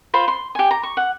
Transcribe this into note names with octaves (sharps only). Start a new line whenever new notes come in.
F4 C5 B5
C6
G4 G#5
A#5
C#6
F#5